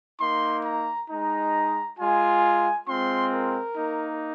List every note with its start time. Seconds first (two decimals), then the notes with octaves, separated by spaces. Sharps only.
0.20 A#3 D#4 C6
0.64 A#5
1.09 G#3 D#4 A#5
1.99 G#3 F4 G#5
2.87 G#3 C4 F4 C6
3.33 A#4
3.76 A#3 D#4